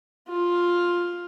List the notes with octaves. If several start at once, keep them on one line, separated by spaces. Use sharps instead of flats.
F4